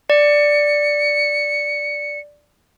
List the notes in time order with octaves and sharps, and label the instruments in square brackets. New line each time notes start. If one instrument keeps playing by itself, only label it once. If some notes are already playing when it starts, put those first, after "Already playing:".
[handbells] D5 [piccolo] C#7